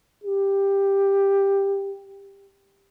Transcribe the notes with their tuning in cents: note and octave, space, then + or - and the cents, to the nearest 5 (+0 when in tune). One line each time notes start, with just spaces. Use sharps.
G4 +10